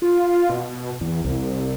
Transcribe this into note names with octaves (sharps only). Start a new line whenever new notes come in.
F4
B2
E2
C2